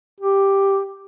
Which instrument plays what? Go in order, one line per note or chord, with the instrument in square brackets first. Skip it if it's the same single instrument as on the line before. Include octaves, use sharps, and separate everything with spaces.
[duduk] G4